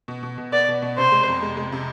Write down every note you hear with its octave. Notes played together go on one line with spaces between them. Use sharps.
B2
B2
B2
B3 D5
B2
B2
C3 C5
G#3
F2
G#3
G#3
C3